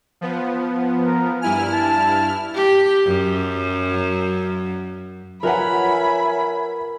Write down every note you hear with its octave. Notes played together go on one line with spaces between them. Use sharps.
F3 B3
A#4
G2 E4 G#5 F6
A5
G4
F#2
F3 A#4 B4 C#5 E5 F#5 G#5 B5